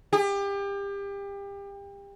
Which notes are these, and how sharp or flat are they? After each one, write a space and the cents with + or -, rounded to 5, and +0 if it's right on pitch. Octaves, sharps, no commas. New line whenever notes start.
G4 +30